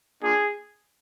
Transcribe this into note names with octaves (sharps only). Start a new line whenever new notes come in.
A#3 D4 F4 G#4